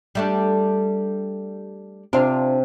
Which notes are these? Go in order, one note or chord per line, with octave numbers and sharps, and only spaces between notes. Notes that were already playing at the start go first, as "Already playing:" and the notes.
G3 A3 D4
C3 D4 F4